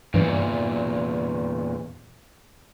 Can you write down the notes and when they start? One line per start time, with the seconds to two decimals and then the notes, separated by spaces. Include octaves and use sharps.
0.14 E2 G2 A#2 E3